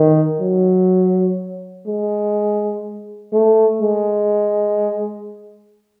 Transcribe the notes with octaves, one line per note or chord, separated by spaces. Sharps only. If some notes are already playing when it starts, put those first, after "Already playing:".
Already playing: D#3
F#3
G#3
A3
G#3